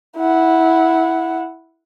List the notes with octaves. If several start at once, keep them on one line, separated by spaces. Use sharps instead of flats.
E4 F#5